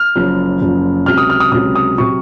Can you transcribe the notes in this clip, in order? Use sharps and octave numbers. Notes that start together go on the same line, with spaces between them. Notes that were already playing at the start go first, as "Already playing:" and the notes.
Already playing: F6
F#1 F#2 F3
F#1 F#2 F3
C#2 C3 F#3 F6
D#6
F6
D#6
C#2 C3 F#3 D#6
D#6
C3 F#3 C#6